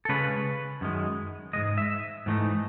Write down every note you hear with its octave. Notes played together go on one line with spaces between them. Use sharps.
A4
C#3 G#3 C#4 B4
F#2 D#3 G#3
G#2 E3 G#3 D#5
E5
G#2 E3 A3 D#4